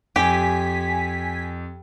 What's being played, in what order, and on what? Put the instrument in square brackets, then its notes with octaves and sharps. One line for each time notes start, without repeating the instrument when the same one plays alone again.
[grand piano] F2 [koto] G4 [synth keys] G#5 B6